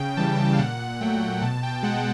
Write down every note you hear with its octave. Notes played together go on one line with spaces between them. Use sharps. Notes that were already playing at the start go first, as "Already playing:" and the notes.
Already playing: C#3 G5
E3 G3 A5
G5
F5
A#2 F#5
F#3 A3 G5
B2 A5
G5
G#3 F#5